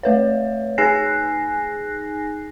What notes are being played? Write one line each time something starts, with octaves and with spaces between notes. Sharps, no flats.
A3 B4 C#5
D#4 G#4 G#5 F#6 A#6 C7